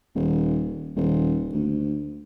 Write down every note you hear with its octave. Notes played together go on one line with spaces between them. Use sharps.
D#1
D#1
D2